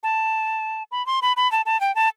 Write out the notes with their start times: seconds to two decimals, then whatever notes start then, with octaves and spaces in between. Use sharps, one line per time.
0.03 A5
0.91 B5
1.06 C6
1.22 B5
1.37 B5
1.52 A5
1.66 A5
1.81 G5
1.95 A5